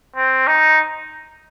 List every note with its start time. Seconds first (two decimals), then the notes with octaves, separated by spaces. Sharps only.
0.16 C4
0.47 D#4